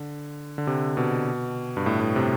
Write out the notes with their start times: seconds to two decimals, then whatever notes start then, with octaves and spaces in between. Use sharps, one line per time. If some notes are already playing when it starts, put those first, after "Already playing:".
Already playing: D3
0.58 D3
0.67 C3
0.97 B2
1.77 G2
1.86 A2
2.01 A2
2.16 C3